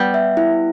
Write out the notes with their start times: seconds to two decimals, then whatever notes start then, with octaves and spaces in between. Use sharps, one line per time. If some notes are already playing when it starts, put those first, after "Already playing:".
Already playing: G3 B3
0.14 E5
0.37 E4